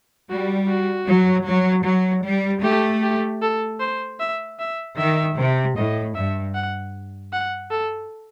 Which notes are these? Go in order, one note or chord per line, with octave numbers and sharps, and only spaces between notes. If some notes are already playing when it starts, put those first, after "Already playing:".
G3 F#4
F#4
F#3
F#3
F#3
G3
A3 G4
G4
A4
C5
E5
E5
D#3 E5
C3
A2 D#5
G2 E5
F#5
F#5
A4